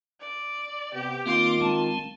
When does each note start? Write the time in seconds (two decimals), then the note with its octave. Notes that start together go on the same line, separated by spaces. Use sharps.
0.20 D5
0.94 C3 B3 G4
1.26 D#3 A#3 C4 F4 C6 D6
1.61 G#3 C4 A5